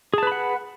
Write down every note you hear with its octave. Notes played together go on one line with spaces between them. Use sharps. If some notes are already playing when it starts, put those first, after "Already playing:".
G#4 B4 F#5 A5 B5